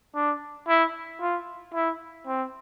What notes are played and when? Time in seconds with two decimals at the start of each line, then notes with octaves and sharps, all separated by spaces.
0.15 D4
0.68 E4
1.21 F4
1.74 E4
2.27 C4